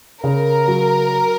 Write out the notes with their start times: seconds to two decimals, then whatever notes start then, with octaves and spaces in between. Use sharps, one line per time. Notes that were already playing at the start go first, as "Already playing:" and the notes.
0.24 C#3 A#4
0.68 F#3